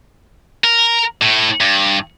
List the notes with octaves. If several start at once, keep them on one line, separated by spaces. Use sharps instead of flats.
A#4
A2
G2